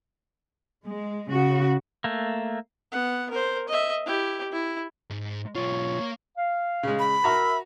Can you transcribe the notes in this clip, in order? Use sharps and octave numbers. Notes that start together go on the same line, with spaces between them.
G#3
C#3 F#4
A3 A#3
B3 F#5
A#4 C5
D#5 E5
E4 G4
E4
G#2
B1 F4 C#5
A#3
F5
C#3 G#3
B5
F#4 A#4 E5 A#5